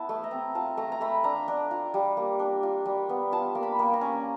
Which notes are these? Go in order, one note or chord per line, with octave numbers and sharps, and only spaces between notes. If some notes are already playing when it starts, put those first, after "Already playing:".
Already playing: B3 E4 A5
A3
A#5
C4
F4 A5
A3 A#5
A#5
A3 B5
D4 A#5
D4
F4
G3
A#3
D4
F4
G3
B3
F4 A5
A#3
B5
A#3
A#5
C#4